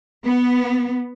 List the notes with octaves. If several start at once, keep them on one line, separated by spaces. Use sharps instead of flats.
B3